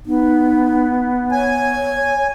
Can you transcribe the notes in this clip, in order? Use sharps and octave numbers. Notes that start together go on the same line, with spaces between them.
B3 D#4
C#5 G#5